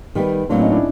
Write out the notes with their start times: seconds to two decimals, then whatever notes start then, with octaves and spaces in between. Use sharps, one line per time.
0.15 D#3 G3 B3
0.49 A2 F#3 A#3 C4 D4
0.61 C#4 D#4
0.72 D4 E4